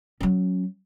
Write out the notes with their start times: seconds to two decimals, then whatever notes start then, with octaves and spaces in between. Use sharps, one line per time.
0.20 F#3 C#4